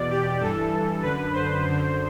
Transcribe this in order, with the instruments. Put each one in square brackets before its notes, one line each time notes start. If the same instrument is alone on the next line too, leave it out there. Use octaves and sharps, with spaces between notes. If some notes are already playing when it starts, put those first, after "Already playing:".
Already playing: [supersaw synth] E2 B2 D5
G4
G2 E3 A4
F#2 D3 B4
C5
F#2 D3